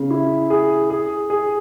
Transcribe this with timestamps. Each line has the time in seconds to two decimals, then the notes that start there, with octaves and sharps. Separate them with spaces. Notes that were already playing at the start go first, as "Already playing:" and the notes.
Already playing: C#3
0.10 E4
0.50 G#4
0.90 G#4
1.30 G#4